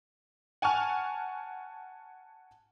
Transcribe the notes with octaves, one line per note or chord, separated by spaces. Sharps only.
F#5 G#5 A5 C#6 F6 F7